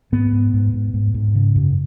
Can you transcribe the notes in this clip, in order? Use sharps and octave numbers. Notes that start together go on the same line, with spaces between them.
G#2 B3
G#2
G#2
G#2
G#2
G#2
C#3
F#2